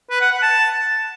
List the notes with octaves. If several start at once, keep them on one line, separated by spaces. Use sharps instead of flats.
B4
F#5
F#5
A5